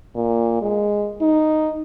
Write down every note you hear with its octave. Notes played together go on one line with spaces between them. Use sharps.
A#2
G#3
D#4